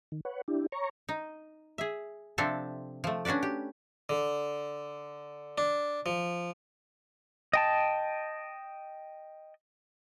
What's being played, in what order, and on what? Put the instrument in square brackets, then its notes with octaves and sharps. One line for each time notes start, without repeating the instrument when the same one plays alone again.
[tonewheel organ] D#3
B4 C#5 F#5
D4 E4 G4
C#5 A#5 C#6
[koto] D#4
G#4 E5
C3 F3 C4 D4 A4 E5
F3 A3
C#4 D4 F#4 B4 D5
G4
[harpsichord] D3
D4
F3
[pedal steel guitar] D#5 G5 A5